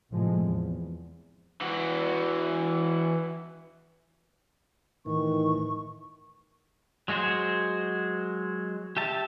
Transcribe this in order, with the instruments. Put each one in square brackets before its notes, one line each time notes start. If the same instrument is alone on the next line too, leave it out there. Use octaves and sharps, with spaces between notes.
[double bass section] A2 C3 F3 G#3
E2
[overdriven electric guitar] E3 F#4
[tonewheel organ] A2 E3 [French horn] D#3 [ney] C#6
[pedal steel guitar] F#3 G#3 F#4 G#4 C5
G4 E5 A5